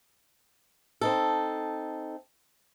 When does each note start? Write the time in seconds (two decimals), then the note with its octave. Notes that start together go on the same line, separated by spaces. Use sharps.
1.01 C4 D#4 A4